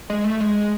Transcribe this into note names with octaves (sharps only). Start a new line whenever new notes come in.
G#3
A3
G#3